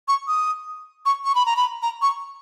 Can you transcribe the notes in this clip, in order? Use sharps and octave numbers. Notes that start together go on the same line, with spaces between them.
C#6
D#6
C#6
C#6
B5
A#5
B5
A#5
C#6